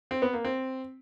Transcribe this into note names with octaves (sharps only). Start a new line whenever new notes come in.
C4
B3
A#3
C4